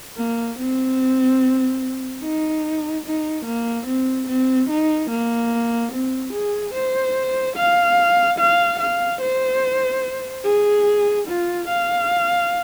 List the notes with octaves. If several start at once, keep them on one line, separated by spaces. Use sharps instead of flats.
A#3
C4
D#4
D#4
A#3
C4
C4
D#4
A#3
C4
G#4
C5
F5
F5
F5
C5
G#4
F4
F5